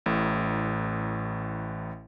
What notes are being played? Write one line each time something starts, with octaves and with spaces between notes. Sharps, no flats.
A1 A2